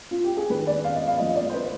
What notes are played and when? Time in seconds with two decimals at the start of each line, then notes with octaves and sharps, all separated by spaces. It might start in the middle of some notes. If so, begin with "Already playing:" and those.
0.11 F4
0.24 G4
0.37 G#4
0.50 G#2 D#3 B4
0.67 D5
0.84 F5
0.96 D#5
1.07 F5
1.18 G#2 F3 D#5
1.29 D#5
1.36 D5
1.50 C5
1.54 B4